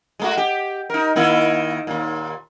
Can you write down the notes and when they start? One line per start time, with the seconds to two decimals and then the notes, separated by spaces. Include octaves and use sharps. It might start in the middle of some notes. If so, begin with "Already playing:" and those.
0.20 G#3 A3 F#4
0.37 G4
0.90 D#4 A#4
1.16 D#3 A#3 E4
1.87 D#2 A#2